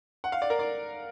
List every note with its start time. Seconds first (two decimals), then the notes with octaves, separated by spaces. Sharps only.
0.24 F#5
0.32 F5
0.42 D5
0.50 A#4
0.59 D5